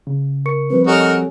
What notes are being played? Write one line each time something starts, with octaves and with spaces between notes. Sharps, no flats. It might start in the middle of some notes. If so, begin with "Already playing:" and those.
C#3
A#4 C#6 C#7
F3 G3 C4 B4
D#4 F#4 G4 A4 A#4 C#5 G#5